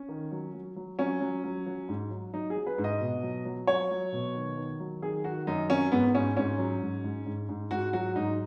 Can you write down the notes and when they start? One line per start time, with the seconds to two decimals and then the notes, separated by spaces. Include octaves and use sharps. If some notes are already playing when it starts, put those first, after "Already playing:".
Already playing: C#4
0.09 D#3
0.32 F#3
0.54 F#3
0.76 F#3
0.99 F#3 C#4
1.21 F#3
1.44 F#3
1.66 F#3
1.88 G#2
2.11 F#3
2.33 F#3 D#4
2.50 G#4
2.56 F#3
2.67 B4
2.78 G#2
2.84 D#5
3.00 B2
3.23 F#3
3.45 F#3
3.67 F#3 C#5
3.90 F#3
4.13 B2
4.35 D#3
4.57 D#3
4.80 F#3
5.02 D#3 G#4
5.24 D#3 F#4
5.47 F#2 D#4
5.70 F#3 C#4
5.91 G#2 B3
6.14 G#2 C#4
6.37 G#2 C#4
6.59 F#3
6.81 G#2
7.04 G#2
7.26 G#2
7.49 G#2
7.71 G#2 F#4
7.93 F#3 F#4
8.16 G#2 D#4